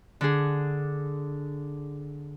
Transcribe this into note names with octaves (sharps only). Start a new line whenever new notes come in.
D3 G#4